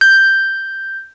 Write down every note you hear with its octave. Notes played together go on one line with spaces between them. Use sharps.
G6